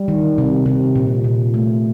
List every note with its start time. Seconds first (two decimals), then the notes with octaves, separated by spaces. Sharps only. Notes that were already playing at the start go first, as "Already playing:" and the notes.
Already playing: G3
0.08 D#3
0.38 C3
0.66 C3
0.96 A#2
1.24 A#2
1.54 A3